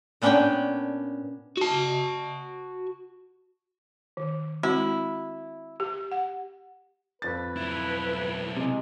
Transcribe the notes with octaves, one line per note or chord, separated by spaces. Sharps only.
A#2 B3 C#4 D4 D5 G5
F#4 A5
D#3
G#3 C4 E4 F#4
G4
F#5
F2 B4 A6
B1 E4
C3 G#3